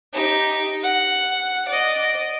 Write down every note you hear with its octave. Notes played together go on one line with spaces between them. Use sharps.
D#4 G4
F#5
D5 D#5